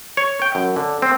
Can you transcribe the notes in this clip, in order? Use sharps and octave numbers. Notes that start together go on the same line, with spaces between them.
C#5
G5
F#2
D3
C4